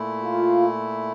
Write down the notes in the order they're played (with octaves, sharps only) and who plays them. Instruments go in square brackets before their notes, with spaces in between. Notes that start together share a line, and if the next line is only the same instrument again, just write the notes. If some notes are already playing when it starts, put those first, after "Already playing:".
Already playing: [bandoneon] A#2 A3 E4
[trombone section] F4